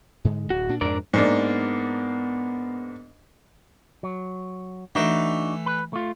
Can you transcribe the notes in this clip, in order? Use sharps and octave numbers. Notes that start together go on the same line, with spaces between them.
G#2 D3 G#3
D1 F#4
A#2 D4
F2 G#2 D4 A#4 D5
G#2 A#3 B3 D4
F#3
E3 A3 D4 D#4 F#4
B4
A3 F4